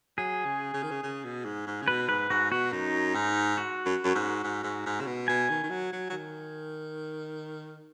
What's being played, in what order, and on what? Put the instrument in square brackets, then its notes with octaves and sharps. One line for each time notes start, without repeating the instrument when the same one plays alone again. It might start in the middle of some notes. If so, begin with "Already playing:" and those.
[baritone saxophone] F#3 [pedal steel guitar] G#4
[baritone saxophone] C#3
C#3
D#3
C#3
C#3
B2
G#2
G#2
C#3
[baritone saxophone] B2 [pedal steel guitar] B4
[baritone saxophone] G#2 [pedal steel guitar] B4
[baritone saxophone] G#2 [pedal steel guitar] F#4
[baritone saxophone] B2 [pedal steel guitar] F#4
[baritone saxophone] F#2 [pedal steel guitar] D#4
[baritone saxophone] G#2
[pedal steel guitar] F#4
[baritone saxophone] F#2
F#2
G#2
G#2
G#2
G#2
C#3
B2
[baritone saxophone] B2 [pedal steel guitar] G#5
[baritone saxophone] D#3
D#3
F#3
F#3
F#3
D#3